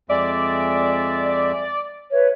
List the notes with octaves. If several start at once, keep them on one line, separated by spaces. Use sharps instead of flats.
F2 G#3 D5 E5
B4 C#5 E5